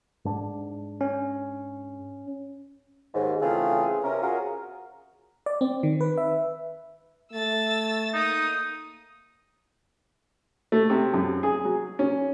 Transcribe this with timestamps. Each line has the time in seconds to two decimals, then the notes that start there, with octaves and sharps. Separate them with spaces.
0.25 G#2 D4
1.01 C#4
3.14 D#2 G#2
3.42 C#3 E3 A3 C4 F4 G#4
4.03 C3 C#4 A#4
4.22 F4 F#4 G#4 A#4
5.46 D5
5.61 C4
5.83 D#3
6.01 B4
6.17 E5
7.33 A3 E6 A6
8.14 A#3 D#4 D#6
10.72 A3
10.90 C3
11.14 F#2
11.43 G#4
11.65 F#3
11.99 C#4